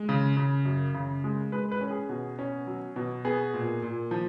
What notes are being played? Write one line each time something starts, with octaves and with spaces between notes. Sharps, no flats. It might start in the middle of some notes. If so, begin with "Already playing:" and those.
Already playing: G#3
C#3
C#3
F#2
C#3
G#3
G#3 B4
B4
C#4
G#4
B2
C#4
F#3
B2
B3 G#4
A#2
A#2
F3